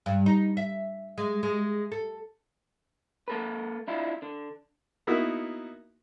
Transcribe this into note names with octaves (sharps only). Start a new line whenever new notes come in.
G2
D#4
E5
G#3
G#3
A4
A#3 A4 B4
D4 E4 F4
D3
A#3 B3 D#4 E4 F#4